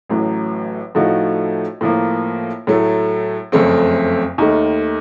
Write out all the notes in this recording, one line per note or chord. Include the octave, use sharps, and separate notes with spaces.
A1 A2 F#3
A2 F3 A3 D#4 F#4
A2 F3 A#3
A2 F#3 A3
F#1 F2 C#3 A3 C4
D#2 D#3 A3